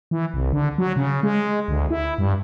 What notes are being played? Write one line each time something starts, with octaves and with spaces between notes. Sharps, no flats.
E3
C2
D3
F#3
C#3
G#3
D2
E4
G2